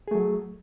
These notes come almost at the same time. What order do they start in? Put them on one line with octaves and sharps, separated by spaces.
G#4 A3 F#3